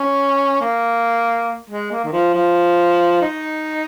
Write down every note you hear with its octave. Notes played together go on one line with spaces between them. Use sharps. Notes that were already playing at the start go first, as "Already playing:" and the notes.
Already playing: C#4
A#3
G#3
A#3
D#3
F3
F3
D#4